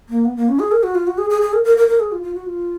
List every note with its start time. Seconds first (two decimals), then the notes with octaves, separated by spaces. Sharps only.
0.09 A#3
0.25 B3
0.37 A#3
0.49 C#4
0.59 G#4
0.72 A#4
0.83 F#4
0.95 F4
1.07 F#4
1.18 G#4
1.30 G#4
1.42 G#4
1.53 A#4
1.65 A#4
1.77 A#4
1.88 A#4
2.00 G#4
2.12 F4
2.23 F4
2.35 F#4
2.46 F4